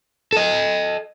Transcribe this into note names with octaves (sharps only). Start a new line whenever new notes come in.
A4 D#5